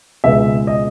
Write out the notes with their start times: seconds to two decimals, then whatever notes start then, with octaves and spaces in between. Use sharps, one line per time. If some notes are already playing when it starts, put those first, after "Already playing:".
0.24 C#2 B2 G#3 B3 E5
0.67 D#5